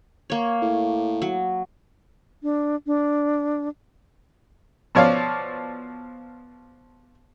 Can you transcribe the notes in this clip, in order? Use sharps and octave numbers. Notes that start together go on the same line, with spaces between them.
A#3 C#5
A2
F#3
D4
D4
B2 F3 C#5 D5 F5 D6